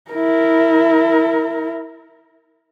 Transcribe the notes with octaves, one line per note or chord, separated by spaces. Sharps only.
E4 A#4